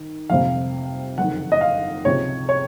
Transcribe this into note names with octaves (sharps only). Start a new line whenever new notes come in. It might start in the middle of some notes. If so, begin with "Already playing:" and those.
Already playing: D#3
F1 F2 C3 F5
F#1 F2 D#3 F#5
D#5
F5
C#2 C3 F3 C#5
C#5